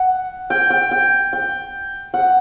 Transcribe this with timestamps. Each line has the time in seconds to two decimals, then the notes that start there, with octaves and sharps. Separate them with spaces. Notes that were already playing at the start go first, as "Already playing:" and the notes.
Already playing: F#5
0.50 G5
0.70 G5
0.91 G5
1.33 G5
2.14 F#5